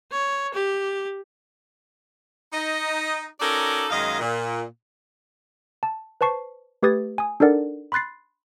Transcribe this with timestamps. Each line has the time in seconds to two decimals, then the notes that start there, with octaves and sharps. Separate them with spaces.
0.11 C#5
0.54 G4
2.53 D#4 D#5
3.40 C#4 D#4 F#4 A4 A#4 D5
3.90 F#2 D#3 G#3 D#5 F5
4.19 A#2
5.83 A5
6.21 B4 C5 A5 C#6 C7
6.83 A3 G4 B4 D#6 G#6 A6
7.18 G#5 D#6
7.40 D4 D#4 A4 A#4 D5 F#5
7.92 B5 C6 F#6 A6 C7